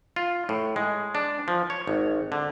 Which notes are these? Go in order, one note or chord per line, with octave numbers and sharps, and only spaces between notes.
F4
A2
G#3
D4
F3
C#5
G#1
D3